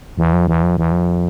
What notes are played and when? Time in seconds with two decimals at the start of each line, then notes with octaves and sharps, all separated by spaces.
0.18 E2
0.33 F2
0.47 E2
0.62 F2
0.77 E2
0.92 F2